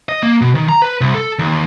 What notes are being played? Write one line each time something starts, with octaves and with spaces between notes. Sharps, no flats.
D#5
A#3
B2
D#3
A#5
B4
C2
A4
D#2